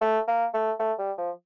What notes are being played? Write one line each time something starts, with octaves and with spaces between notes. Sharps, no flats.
A3
A#3
A3
A3
G3
F3